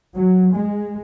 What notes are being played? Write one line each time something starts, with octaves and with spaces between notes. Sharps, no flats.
F#3
G#3